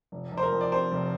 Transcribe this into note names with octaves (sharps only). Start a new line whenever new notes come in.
F1
F1
C5
A#4
F2
D5
C3 C5
F1